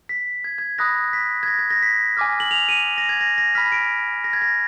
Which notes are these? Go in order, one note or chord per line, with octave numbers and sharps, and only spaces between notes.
B6
G#6
G#6
B5 D#6 F#6 A#6
B6
G#6
A#6
G#6
A#6
B6
G#5 D6 F6
F#7
F7
D#7
A#6
G#6
A#6
A#6
B5 F6 B6
D7
A#6
G#6
A#6